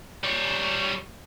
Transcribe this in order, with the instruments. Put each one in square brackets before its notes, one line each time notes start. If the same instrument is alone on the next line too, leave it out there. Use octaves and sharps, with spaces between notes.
[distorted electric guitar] G3 C#5